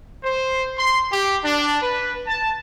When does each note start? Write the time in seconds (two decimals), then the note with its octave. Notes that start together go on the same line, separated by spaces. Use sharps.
0.23 C5
0.77 C6
1.11 G4
1.43 D4
1.82 B4
2.27 A5